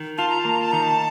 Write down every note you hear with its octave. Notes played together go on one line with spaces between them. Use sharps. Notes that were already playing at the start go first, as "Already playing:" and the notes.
Already playing: D#3
F4 A5
A#5
A5
A#3 A#5
A5
D#3 A#5
A5